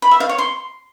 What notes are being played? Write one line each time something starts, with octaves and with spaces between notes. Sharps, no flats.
B5
E5
F5
C#5
C6